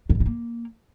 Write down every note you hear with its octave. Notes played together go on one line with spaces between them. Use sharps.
F2
G#2
F3
A#3